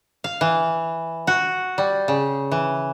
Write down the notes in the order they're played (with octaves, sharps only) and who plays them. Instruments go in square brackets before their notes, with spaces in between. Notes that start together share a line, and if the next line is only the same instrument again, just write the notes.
[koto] F5
E3
F#4
G3
C#3
E3